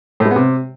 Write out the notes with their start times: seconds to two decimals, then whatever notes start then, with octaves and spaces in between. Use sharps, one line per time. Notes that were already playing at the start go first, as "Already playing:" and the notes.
0.20 A2
0.25 G#3
0.31 B3
0.36 C3